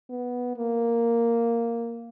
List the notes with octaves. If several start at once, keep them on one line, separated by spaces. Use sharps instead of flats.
B3
A#3